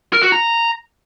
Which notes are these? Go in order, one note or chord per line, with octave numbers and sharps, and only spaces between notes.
A#4
F#4
A#5